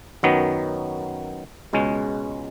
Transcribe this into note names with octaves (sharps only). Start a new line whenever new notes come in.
F#2 D#3 F#3 B3
C#2 B2 G#3 C#4